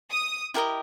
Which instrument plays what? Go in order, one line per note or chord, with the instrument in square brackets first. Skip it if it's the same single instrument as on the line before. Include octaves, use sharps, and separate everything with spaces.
[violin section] D#6
[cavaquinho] E4 G4 A#4 D#5